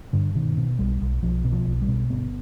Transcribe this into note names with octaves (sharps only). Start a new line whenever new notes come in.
G2 D3
B2 D#3
B2
B1 G3
B1
B1 F3
B2
F3
B1
G3
B2
G1 B3